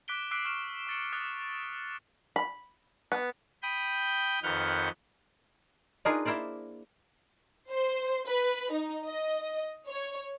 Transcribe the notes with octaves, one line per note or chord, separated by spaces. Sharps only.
D6 F#6 B6 D7 G7
D6 E6 F#6 B6 C7 D7
C#6 F6 F#6 B6 D7 E7
C#6 A6 C#7
D6 D#6 F#6 A6
B5
B3
G5 B5 D#6 G6
F2 D#3 B4 F#5 F6 G6
D4 D#4 F4 G#4 A#4 B4
A#3 E4 A#4 C5 D5
C5
B4
D#4
D#5
C#5